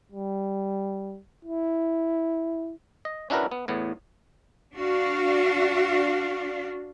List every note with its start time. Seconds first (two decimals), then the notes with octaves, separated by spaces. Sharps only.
0.12 G3
1.45 E4
3.05 D#5
3.30 C#4 D4 E4 F#4 A#4 B4
3.51 B3
3.68 E2 A2 B3
4.74 D4 F#4 F5